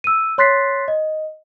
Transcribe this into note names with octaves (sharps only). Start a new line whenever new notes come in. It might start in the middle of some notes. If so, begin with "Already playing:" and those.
E6 D#7
C#5 C6 F#6 A6 B6 C7
D#5